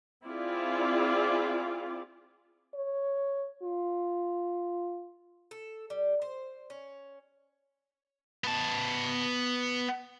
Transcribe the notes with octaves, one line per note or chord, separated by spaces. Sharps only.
C4 E4 F4 G#4 D5
C#5
F4
A4
G3
C5
C#4
B3 A5